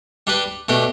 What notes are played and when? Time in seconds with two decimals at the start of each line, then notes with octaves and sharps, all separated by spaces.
0.27 G3 D4 G4 B4
0.69 B2 A3 D4 G4